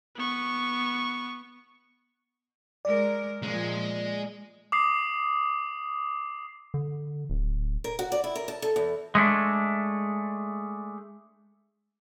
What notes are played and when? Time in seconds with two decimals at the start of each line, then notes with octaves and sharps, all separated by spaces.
0.15 B3 C#6
2.85 G#3 A#4 D5
3.43 A#2 F3 G#3
4.72 D6 D#6 C7
6.74 D3
7.30 D1
7.84 A#4
7.99 F#4
8.12 D5
8.24 E4
8.36 A#4
8.48 A5
8.62 A4
8.76 E2
9.15 G#3 A3 C#4 D4